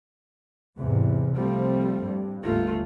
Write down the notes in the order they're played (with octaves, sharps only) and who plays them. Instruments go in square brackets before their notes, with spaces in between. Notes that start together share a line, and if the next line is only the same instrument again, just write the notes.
[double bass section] E2 G#2 C3
[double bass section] C2 F3 C4 [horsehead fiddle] G3 A3
[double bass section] G2
[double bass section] G1 D#2 [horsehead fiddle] A3 F4